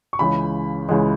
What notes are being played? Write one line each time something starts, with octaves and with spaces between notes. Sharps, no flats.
C#6
C#2 C#3 E3 G#3 B5
C#2 C#3 E3 G#3